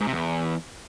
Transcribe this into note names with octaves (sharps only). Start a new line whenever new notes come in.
G#2
C3
E2